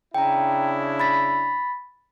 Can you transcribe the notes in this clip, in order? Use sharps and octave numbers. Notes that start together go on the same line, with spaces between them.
C#3 D4 E4 G5 A#5
B5 A6 B6